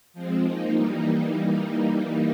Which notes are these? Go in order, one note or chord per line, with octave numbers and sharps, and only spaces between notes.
F3 G#3 C4
F3 A#3 D#4
E3 G3 A#3 D#4